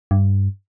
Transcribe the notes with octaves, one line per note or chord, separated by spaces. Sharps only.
G2